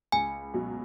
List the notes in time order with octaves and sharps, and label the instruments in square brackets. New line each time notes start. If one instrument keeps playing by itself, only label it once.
[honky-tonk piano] C#2 [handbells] G#5
[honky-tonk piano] B2 F#3